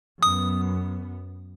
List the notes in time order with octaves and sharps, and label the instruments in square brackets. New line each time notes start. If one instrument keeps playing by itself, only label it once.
[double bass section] F#2 B3 [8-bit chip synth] D#6